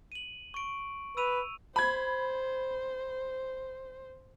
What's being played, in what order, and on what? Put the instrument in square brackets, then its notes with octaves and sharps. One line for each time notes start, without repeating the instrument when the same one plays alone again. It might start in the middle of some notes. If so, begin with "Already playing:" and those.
[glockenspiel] D#7 F#7
C#6 D7
[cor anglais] B4 [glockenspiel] E6 D#7 F7
[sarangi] C5 [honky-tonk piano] B5 G#6